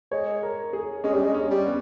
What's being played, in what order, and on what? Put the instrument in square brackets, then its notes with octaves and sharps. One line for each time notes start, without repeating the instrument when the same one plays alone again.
[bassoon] G#3 [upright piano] C#5
[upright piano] A#4
G#4
[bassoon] G#3 [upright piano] C#4
[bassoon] G3
G#3
[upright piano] C#4
[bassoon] G3
[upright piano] B3